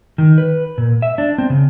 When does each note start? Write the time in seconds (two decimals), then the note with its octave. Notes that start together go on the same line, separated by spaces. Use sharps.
0.18 D#3
0.38 B4
0.78 A#2
1.02 E5
1.18 D4
1.38 C4
1.50 C#3